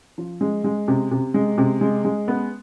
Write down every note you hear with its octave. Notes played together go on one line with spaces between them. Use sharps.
F3
G#3
G#3
C3
C3
G#3
C3
G#3
G#3
B3